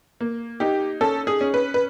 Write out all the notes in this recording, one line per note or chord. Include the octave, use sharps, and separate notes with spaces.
A#3
D#4 G4
C#4 A4
G#4
C#4
B4
B4